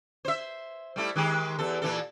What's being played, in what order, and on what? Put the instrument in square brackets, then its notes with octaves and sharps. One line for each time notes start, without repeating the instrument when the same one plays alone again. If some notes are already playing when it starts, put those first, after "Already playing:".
[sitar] C5 E5
G3 A3 E4
D#3 G#3 G4
E2 A4
A#2 E3 A4